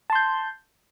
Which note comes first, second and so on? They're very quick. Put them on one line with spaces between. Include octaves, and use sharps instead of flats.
A5 C6 G6